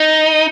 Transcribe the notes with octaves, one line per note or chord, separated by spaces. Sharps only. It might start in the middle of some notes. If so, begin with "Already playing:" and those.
Already playing: D#4